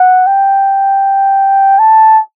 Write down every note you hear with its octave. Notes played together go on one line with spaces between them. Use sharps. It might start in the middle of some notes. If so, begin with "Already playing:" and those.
Already playing: F#5
G5
A5